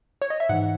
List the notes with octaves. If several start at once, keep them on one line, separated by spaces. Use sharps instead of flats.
C#5
D#5
E5
G#2 E3 F#5